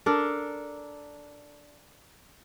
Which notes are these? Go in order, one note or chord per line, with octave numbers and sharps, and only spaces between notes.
D4 A4 A#4